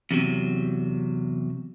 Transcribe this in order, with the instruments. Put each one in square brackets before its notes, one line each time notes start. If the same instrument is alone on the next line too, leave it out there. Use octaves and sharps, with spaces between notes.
[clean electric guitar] E2 C3 F#3